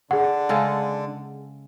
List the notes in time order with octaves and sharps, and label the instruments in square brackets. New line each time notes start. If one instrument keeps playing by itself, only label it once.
[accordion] D3 D4 [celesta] G#4 F#5
[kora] C#3 G#3 A4